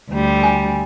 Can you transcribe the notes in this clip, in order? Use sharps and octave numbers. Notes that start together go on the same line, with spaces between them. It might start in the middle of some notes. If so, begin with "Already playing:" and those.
D2 G3
G#5